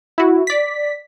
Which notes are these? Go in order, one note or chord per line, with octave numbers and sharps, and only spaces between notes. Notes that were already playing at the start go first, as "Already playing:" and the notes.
E4 F#4
D5 B6